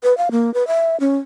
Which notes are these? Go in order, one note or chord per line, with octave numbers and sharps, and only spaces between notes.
B4
F5
A#3
B4
E5
C#4